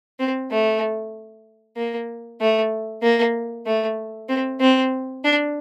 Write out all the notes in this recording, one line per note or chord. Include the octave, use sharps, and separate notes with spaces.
C4
A3
A#3
A3
A#3
A3
C4
C4
D4